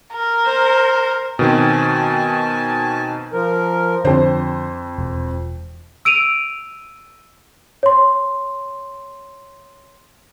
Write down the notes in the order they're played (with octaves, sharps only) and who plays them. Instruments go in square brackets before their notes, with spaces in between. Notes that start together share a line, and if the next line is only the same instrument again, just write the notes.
[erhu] A#4
[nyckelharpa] C5
[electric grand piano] B2 D#3 C4 [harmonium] G#5 A5
[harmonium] F3 A#4
[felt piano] F2 C5 [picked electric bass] D3
[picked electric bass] E1
[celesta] E6 D7 D#7 F7
C#5 C6